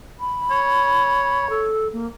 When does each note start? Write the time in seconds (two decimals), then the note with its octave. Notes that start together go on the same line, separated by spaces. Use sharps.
0.20 B5
0.50 C#5
1.50 A4
1.93 A#3